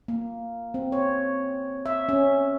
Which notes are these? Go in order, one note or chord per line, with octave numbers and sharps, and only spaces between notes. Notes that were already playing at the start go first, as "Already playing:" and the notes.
A#3
C4
C#5
E5
C#4